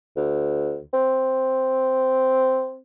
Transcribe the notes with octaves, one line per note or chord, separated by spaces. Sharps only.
D2
C4